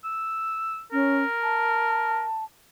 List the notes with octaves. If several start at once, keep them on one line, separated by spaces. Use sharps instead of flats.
E6
C#4 A#4
A5